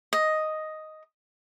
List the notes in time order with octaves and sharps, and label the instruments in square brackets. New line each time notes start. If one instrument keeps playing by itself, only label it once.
[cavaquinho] D#5